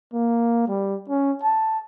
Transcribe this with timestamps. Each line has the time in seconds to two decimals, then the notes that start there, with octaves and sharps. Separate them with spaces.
0.14 A#3
0.68 G3
1.09 C#4
1.43 A5